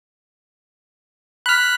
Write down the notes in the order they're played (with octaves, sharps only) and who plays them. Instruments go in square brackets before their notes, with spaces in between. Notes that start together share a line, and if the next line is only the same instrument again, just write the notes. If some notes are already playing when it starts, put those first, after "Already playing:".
[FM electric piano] B5 F6 [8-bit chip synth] F#6 B6